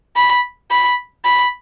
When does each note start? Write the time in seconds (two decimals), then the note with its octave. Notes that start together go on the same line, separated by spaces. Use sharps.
0.16 B5
0.71 B5
1.25 B5